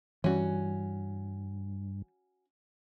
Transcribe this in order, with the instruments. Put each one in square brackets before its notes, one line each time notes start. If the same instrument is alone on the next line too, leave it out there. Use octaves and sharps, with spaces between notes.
[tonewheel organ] G2 [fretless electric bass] E3 G3 [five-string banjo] C#4 F#4